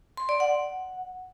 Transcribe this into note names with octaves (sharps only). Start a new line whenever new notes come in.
C6
D5
F#5